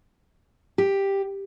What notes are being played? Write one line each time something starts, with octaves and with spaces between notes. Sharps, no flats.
G4